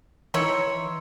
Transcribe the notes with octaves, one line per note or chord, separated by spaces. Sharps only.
E3 D#4 E4 C#5 C6 E6 C#7